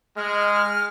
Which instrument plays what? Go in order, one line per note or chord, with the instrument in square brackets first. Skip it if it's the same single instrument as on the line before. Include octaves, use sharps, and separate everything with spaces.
[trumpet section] G#3 [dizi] F6